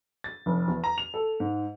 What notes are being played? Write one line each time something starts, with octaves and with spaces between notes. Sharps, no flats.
A6
F1
E2
A#5
F7
A4
G#2